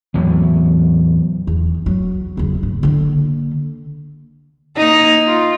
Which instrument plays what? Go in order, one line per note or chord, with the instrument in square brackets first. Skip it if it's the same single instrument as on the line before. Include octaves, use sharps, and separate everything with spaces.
[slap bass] E2 A2 F#3
[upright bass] E2
F#3
F#1 E2
A2
D3 A#3
[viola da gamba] A#3 D#4
F4